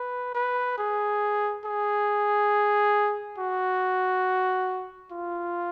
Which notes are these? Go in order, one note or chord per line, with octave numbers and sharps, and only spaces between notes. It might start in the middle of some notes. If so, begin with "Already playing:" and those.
Already playing: B4
B4
G#4
G#4
F#4
F4